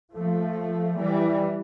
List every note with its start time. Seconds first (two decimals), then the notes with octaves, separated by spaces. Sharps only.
0.13 F3 A3
0.96 E3 G3